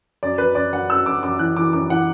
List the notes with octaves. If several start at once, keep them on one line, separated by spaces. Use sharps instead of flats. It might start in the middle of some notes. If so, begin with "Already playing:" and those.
F#2 D5
F#2 B4
F#2 D5
F#2 F#5
F#2 E6
F#2 D6
F#2 D6
E3 F#6
E3 D6
F#2 D6
E3 F#5